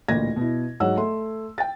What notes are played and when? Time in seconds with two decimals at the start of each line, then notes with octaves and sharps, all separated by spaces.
0.08 A1 D2 A#2 G#6 A#6
0.36 B2 E4
0.80 G#2 F#3 C#5 F#5 E6
0.96 A3 C6
1.58 G5 A6